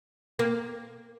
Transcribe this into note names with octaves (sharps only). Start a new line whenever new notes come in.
A#3